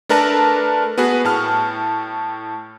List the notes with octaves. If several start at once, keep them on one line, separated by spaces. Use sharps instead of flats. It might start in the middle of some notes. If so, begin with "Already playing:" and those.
A3 D4 A#4 B4 A5 A#6
B3 F#4 G#4 B4
A2 A5 F6